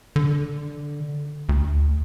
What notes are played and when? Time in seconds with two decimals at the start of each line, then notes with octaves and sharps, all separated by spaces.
0.16 D3
1.49 D2